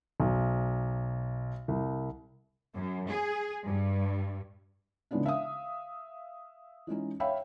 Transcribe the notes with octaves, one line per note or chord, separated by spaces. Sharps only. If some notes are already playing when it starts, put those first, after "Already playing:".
B1
C2
F#2
G#4
G2
C#3 E3 G#3 B3 D4 D#4
E5 F5 D#6
E3 G#3 C#4 D#4
C#5 E5 F5 G5 B5